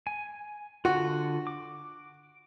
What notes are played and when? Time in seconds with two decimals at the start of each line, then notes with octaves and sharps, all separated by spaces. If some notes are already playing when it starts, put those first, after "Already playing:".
0.07 G#5
0.85 D3 F4 F#4
1.47 D6